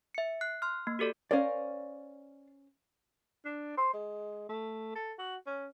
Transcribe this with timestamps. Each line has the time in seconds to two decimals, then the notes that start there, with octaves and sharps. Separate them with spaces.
0.15 E5 C#7
0.41 F#6 C7
0.62 C6 F6
0.87 A#3
0.99 F#4 G4 A4 D5
1.31 C#4 A#4 C5 D5 F5
3.45 D4
3.78 C5
3.94 G#3
4.49 A3
4.95 A4
5.19 F#4
5.47 C#4